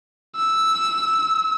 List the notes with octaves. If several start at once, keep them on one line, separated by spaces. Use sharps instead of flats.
E6